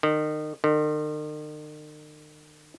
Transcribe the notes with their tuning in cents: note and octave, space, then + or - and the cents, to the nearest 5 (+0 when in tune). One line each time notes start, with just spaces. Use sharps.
D#3 -30
D#3 -45